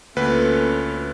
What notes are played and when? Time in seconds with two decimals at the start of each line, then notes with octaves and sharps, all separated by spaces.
0.16 D2 A#3 C#4 F4 A4 B4